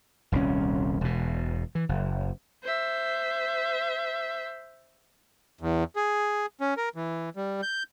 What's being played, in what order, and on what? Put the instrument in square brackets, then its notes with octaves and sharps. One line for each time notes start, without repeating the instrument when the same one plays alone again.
[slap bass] D#1 C2 D3 C#4
E1 B2
E3
F#1
[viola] C5 E5
[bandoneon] E2
G#4
C#4
A#4
E3
G3
G6